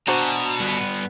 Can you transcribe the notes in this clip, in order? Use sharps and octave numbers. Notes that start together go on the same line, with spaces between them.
B2 D4 F#4 C5 A5 A#5
G2 B3